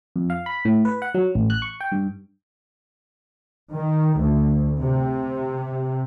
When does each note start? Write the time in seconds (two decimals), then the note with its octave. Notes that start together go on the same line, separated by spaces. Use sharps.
0.16 F2
0.30 F5
0.46 B5
0.65 A2
0.85 B4
1.02 F#5
1.15 F#3
1.35 A1
1.50 F#6
1.62 C#6
1.81 G5
1.92 G2
3.72 D#3
4.19 D2
4.79 C3